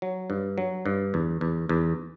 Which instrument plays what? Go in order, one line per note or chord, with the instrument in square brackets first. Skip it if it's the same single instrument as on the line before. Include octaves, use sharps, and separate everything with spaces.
[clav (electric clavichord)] F#3
G2
F#3
G2
E2
E2
E2